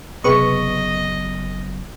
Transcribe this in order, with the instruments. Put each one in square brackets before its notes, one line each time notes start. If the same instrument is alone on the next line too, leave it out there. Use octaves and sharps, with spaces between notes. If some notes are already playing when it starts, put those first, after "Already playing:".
[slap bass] F#1 B3 [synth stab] C3 B4 C#6 [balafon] G#4 [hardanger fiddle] D#5